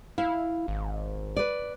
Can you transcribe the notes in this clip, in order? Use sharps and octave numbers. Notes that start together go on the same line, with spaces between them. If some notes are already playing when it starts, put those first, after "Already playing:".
E4 F5
G#1
B4 D5